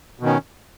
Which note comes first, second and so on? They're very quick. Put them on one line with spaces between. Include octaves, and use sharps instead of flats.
B2 D#3 C#4